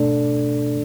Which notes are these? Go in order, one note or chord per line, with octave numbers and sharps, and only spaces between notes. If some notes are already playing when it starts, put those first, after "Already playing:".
Already playing: B2 A3 D4 A4 D5